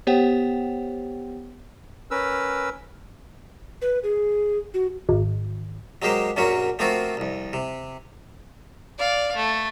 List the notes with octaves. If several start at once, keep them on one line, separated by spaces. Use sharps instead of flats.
B3 G4 C5 C#5 F#5 G5
C#4 A#4 B4 E6
B4
G#4
F#4
G#1
F#3 G#3 A#3 G4 C5
A#1 F#2 F#3 A#3 C#4 F#4
F3 A3 A#3 C4 F4 F#4
C2 F2
C3
D5 F5
A3